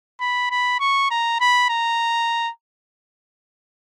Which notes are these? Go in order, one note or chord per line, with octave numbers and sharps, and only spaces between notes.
B5
B5
C#6
A#5
B5
A#5